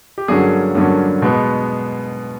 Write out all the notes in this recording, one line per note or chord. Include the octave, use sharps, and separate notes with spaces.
G4
G2 D3 F#3 A#3 C#4 G#4
G2 D3 F#3 A#3 C#4
B2 G#3 B3